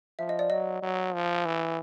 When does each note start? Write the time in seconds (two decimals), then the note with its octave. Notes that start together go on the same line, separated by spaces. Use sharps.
0.19 F3 E5
0.29 D#5
0.39 D5
0.50 F#3 D#5
0.82 F#3
1.14 F3
1.45 E3